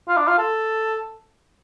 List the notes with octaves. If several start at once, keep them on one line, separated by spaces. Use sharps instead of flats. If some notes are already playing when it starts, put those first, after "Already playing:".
F4
D4
F4
A4